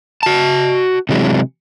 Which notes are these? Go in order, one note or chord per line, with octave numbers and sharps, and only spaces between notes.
F#4 A5
C3 E3 F#3 G#3